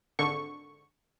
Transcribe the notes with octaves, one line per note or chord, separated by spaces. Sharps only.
G#1 D3 C#6